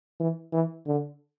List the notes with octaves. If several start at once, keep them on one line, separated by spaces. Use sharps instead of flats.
E3
E3
D3